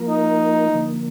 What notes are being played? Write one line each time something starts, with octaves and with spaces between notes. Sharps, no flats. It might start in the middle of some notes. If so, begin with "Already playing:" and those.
Already playing: F3 A#3 F4 A#4
D#4
D3 F3 A#3